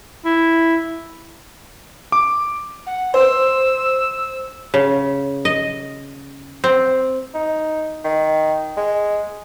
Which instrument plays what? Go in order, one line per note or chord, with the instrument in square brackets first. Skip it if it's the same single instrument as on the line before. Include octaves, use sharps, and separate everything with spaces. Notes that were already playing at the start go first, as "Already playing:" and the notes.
[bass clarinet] E4
[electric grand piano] D6
[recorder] F#5
[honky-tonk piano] C5 [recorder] E6
[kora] C#3
D#5
C4
[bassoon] D#4
D#3
G#3